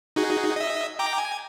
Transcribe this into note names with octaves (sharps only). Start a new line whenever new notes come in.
D#4 F#4 G#4
D#5 E5
G5 A#5 D6
G#5